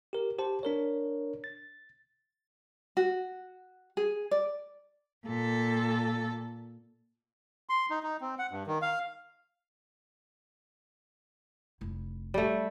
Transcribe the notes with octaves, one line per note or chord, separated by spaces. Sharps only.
G4 A#4
G4 C5 A5
D4 A#4 C#5
A6
F#4
G#4
D5
A#2 A4
C6
D#4
D#4
C4
F#5
G2
D#3
F5
F1 E4
G3 A3